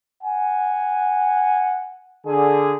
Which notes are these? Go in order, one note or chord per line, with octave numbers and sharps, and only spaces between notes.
F#5 G#5
D3 G#4